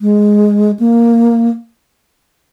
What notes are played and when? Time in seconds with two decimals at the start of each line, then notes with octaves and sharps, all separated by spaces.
0.01 G#3
0.79 A#3